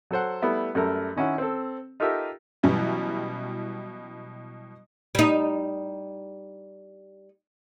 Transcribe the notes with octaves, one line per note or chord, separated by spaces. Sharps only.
F#3 A4 C5 F#5
G3 A3 B3 E4
F#2 G3 A3 A4 A#4 F6
D#3 C#4 E4 F#4
C4 A4
D#4 F4 G4 A4 A#4 E5
B2 E3 F#3 G3 C#4 E4
G3 D#4